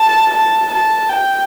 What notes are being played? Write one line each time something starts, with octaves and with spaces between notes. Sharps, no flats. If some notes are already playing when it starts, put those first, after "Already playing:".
Already playing: A5
A5
A5
G5